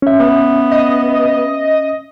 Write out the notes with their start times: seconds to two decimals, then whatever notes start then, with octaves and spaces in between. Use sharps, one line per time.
0.02 C#4 E5
0.19 B3
0.71 D#5